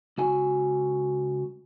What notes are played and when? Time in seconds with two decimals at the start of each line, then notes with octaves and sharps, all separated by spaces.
0.18 C#2 F#4 G#5